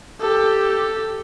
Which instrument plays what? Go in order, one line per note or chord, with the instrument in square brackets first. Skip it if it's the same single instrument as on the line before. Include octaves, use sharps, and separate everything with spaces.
[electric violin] G4 A4